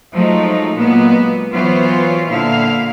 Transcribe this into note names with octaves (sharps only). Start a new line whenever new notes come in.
F3 F#3 G#3 A3 D#4
A#2 F#3 G#3 A#3 B3
E3 F#3 B3 F4 C5 C#5
A#2 D3 E4 F5